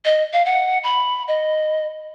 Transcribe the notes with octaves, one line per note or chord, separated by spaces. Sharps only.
D#5
F5
F#5
B5
D#5